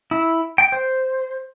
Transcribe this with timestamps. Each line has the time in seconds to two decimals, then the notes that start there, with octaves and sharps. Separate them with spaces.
0.11 E4
0.58 G5
0.72 C5